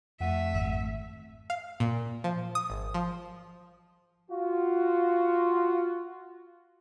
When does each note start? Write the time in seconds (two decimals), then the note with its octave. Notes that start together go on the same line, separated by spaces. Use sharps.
0.20 F2 A3 E5 F#5 D#7
0.54 G#1
1.50 F5
1.80 A#2
2.24 F3
2.55 D#6
2.70 G#1
2.94 F3
4.30 F4 F#4